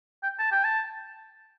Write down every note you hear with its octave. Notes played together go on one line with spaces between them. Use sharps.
G5
A5
G5
A5